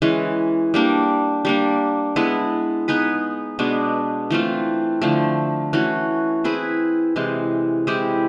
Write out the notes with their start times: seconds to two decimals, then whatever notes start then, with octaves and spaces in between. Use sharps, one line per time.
0.02 E3 G#3 C#4
0.74 G3 A#3 D4
1.45 G3 A#3 D4
2.16 G#3 B3 E4 A4
2.88 B3 D#4 G#4 B4
3.59 B2 G#3 B3 D4
4.31 E3 A3 C4 F4
5.02 D3 F3 A3
5.73 E3 A3 C#4 F#4
6.44 C4 E4 G#4 B4
7.16 C3 E3 G#3
7.87 G#3 C4 E4 G4